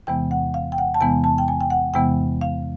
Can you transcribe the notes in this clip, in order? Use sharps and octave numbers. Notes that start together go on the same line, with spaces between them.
E2 C3 E3 G#3 B3 G5
F#5
F5
G5
F#5
A5
E2 C3 E3 G#3 B3 G#5
A5
G5
G#5
G5
F#5
E2 C3 E3 G#3 B3 G5
F5